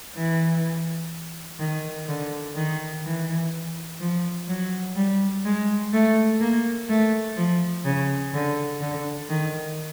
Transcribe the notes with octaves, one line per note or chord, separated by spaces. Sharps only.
E3
D#3
D3
D#3
E3
F3
F#3
G3
G#3
A3
A#3
A3
F3
C#3
D3
D3
D#3